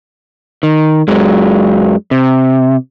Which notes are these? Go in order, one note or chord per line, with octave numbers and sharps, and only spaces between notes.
D#3
F#2 F#3 G#3
C3